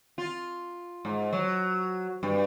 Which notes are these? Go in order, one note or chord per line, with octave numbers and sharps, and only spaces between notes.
F4
G#2
F#3
G2